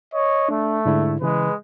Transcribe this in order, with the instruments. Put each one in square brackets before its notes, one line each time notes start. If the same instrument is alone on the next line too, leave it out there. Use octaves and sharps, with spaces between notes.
[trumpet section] C#5 D#5
[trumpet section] A3 [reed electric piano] D4
[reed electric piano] G#2 D3 E4
[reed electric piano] C#3 E3 [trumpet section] G#3 B4